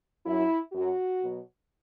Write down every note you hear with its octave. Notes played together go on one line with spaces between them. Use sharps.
F#2 F#3 E4
F#2 F#3 F#4
B2 F#3